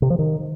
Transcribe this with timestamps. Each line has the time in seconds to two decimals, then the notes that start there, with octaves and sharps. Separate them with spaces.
0.02 C3
0.10 F3
0.19 D#3